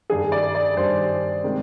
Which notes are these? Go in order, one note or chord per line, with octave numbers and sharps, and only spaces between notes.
G2 D#3 G3 D4 G#4
D5
D5
G2 D#3 G3 D4 C5
C3 D#3 G#3